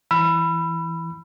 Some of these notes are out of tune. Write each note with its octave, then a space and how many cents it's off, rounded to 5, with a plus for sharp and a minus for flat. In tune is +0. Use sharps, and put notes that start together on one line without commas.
E3 +0 B5 +0 E6 +40